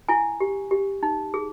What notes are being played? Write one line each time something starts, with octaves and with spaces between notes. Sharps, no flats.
E4 G#5
G4
G4
D#4
G#4